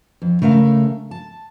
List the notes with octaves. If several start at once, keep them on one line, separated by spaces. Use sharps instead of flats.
F2
C#3 A3 A#4 F5
A5